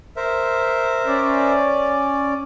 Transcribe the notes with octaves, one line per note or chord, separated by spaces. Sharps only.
A#4 C5 E5
C#4 D5